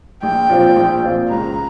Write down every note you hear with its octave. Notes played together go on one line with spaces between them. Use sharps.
A#1 G5
A#2 F3 C4 F4
A#1
A#2 F3 C4 F4
C#2 A#5